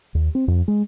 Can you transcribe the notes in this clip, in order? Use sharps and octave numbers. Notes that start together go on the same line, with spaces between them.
D#2
C4
F2
G#3